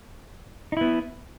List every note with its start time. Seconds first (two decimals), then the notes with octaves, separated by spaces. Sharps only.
0.72 D#4
0.77 E4
0.81 B3